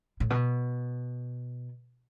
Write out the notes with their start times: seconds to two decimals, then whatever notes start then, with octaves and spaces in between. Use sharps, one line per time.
0.20 A2
0.30 B2